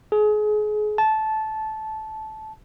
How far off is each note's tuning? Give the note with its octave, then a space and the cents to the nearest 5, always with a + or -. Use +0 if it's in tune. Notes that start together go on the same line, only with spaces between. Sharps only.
G#4 +30
A5 -15